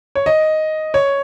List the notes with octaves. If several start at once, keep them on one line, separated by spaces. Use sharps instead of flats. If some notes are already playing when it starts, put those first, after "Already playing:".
C#5
D#5
C#5